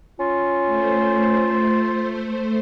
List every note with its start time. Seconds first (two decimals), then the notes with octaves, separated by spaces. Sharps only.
0.19 C#4 F4
0.65 A3 C5